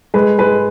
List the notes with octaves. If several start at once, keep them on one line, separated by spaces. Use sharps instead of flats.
G#3 B4
G#3 B4